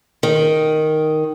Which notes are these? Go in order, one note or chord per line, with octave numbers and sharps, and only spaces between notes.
D#3